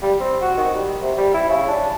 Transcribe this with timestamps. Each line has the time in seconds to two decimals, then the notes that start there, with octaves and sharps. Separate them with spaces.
0.03 G3
0.20 C4
0.42 F#4
0.58 D#3
0.75 G3
1.02 C3
1.18 G3
1.34 E4
1.49 C#3
1.68 D4